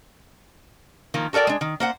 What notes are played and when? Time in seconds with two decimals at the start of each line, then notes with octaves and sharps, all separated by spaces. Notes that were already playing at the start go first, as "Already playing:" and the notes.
1.14 D#3 F3 A#3
1.33 F#4 A4 A#4 D5 G5
1.47 G#3 D4
1.61 D#3
1.80 A#3 C5 F#5